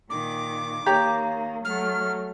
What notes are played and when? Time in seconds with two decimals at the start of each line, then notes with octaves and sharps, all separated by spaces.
0.10 A#2 D#3 D6
0.86 D#3 A#3 G4 C#5 A#5
1.65 F#3 A3 F6